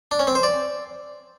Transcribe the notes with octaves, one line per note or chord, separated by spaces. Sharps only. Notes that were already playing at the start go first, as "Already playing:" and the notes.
D4
C#4
C4
C5
D5